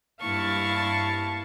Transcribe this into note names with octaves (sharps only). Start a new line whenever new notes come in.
G2 A#3 E4 F5 A5 C#6